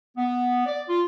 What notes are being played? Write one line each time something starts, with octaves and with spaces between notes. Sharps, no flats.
B3
D5
F4